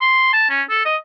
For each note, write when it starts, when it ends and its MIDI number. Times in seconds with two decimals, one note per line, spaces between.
0.01 0.29 84
0.33 0.49 81
0.50 0.62 61
0.70 0.81 69
0.85 0.96 75